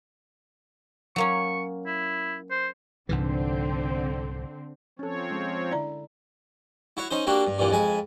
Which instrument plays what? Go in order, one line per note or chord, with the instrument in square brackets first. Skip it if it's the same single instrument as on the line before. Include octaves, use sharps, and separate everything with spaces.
[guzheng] F#3 A#3 C#4 [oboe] C#6
[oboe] E4
C5
[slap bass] C2 G#2 E3 [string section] D3 C4
[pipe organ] F3 C4 C#5 [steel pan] C#4 A4
[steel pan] G#3 C#4
[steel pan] D3 E4 [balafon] D5 A#5
[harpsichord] E4 F#4 C#5
C#4 D#4 C5
G3 A#3 D4 F#4
G2
G2 A#2 E3
F2 G#3 G#5 B5